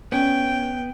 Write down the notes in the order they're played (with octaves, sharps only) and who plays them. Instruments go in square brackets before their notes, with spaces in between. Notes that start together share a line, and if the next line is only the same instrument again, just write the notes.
[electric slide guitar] B3 [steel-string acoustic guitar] C#4 [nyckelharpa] G5